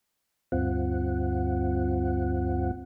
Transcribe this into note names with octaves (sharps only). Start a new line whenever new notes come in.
D2 G2 C4 F4 F#5